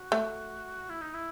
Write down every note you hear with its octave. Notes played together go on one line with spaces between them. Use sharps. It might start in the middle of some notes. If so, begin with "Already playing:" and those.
Already playing: F#4
A3
E4
D#4
E4